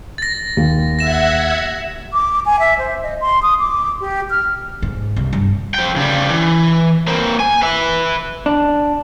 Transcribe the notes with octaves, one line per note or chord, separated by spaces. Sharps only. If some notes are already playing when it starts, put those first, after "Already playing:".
A6 A#6
D#2
E5 F#5 G#6 A#6 E7
D6
G#5
E5
C5
D#5
C6
D#6
D6
G4
F6
G#2
C2
G2
F3 G5
C#3 G3
E3
A#3 C4
G#5
B4 E5
D4